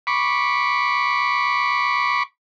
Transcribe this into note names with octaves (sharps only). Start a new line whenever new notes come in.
B5 C#6 D6